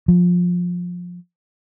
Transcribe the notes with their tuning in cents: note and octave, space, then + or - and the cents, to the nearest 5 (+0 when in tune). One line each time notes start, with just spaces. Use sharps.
F3 +20